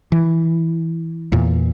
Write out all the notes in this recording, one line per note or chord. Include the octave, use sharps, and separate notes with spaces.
E3
E2 A#2